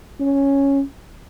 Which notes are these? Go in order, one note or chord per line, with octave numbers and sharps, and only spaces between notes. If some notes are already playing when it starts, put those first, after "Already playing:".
C#4